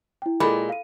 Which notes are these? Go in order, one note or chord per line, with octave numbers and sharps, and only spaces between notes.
E4 G5
A#2 G#3 A4 B5
F5 D#7